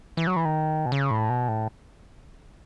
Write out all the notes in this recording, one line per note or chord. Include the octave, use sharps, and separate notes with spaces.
E3
F#3
E3
D#3
B2
C#3
A2
B2
A2